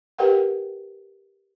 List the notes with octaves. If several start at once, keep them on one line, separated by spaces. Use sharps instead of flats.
G4 A#4 B4 D#5 F#5 G5